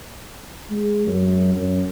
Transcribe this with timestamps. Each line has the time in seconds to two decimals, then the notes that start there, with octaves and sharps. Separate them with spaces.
0.70 G#3
1.07 F#2
1.55 F#2